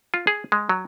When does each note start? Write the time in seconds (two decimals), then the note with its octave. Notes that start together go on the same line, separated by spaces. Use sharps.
0.14 F4
0.27 G#4
0.52 G#3
0.69 F#3